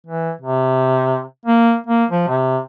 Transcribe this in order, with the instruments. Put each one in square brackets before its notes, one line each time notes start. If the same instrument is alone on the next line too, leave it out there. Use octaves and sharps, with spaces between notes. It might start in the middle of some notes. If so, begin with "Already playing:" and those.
[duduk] E3
C3
A#3
A#3
F3
C3